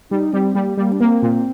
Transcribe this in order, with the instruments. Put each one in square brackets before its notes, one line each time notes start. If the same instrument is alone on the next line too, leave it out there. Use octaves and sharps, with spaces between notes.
[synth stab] G3 [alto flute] D#4
[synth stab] G3 [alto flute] C4
[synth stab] G3 [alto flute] A#3
[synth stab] G3 [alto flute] A#3
[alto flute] D4
[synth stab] A#3 [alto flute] C4
[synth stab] A#2